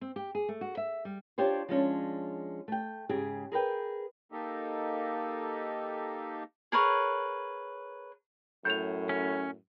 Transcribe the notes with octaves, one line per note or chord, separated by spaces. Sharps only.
C4
G4
G#4
A3
F#4
E5
G3
D4 F4 G4 C5 C#5
F3 G#3 C#4 D4
A3 G5
G#2 C#3 G4 G#4
G#4 A#4 B4 G5
A#3 D#4 G4 A4
G#4 A#4 B4 C#5
F#2 A2 G6 F7
C#4